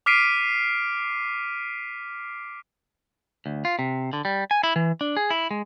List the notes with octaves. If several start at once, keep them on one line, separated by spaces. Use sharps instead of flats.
D6 F6 B6 C7 D7 D#7
D2
F4
C3
D3
G3
G#5
E4
E3
D4
G#4
E4
G#3